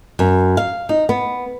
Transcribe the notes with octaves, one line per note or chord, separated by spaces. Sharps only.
F#2
F5
D#4
B3